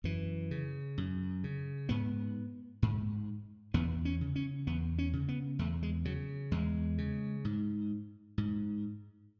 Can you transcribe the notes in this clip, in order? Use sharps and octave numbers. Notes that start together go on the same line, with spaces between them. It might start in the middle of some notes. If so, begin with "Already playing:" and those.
F#2 E3
C#3
F#2
C#3
G#2 B3
G#2
E2 B3
C#4
C#3
C#4
E2 B3
C#4
C#3
B3
E2 A3
G#3
C#3 F#3
E2 G#3
C#3
G#2
G#2